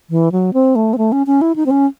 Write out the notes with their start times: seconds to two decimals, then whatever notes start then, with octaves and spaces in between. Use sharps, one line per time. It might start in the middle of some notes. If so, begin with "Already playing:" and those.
0.10 E3
0.32 F#3
0.53 C4
0.76 A3
0.93 C4
0.98 A3
1.12 C#4
1.27 C#4
1.41 E4
1.56 D#4
1.66 C4
1.71 C#4